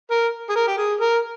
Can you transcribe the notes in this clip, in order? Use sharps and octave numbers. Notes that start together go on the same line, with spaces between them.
A#4
G#4
A#4
G4
G#4
A#4